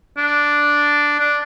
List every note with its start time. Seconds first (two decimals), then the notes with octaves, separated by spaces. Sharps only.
0.17 D4
1.20 D4